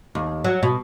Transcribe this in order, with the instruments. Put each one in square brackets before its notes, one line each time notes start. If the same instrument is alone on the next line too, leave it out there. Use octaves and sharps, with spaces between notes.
[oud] D#2
F#3
B2